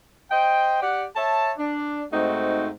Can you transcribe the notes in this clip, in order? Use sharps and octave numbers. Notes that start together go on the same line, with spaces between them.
C5 D#5 G5
G4 D5 F#5
C#5 E5 A5
D4
G#2 A3 C4 D#4 F#4